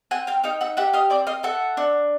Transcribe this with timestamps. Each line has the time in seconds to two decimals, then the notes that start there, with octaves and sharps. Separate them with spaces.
0.11 C4 F#5 G#5
0.27 F5 G5
0.44 D#4 F5 G5
0.61 E5 F#5
0.77 G4 E5 F#5
0.93 D#5 F5
1.10 C4 D5 E5
1.27 D#5 F5
1.43 A4 E5 F#5
1.77 D4